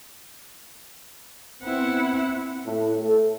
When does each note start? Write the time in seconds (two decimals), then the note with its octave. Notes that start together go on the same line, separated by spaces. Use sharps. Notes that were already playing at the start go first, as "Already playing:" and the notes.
1.63 B3 C4 E4 F#5
2.66 A2
3.01 A4